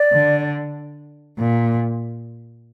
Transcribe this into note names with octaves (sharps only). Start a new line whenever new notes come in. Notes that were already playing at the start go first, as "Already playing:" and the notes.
Already playing: D5
D3
A#2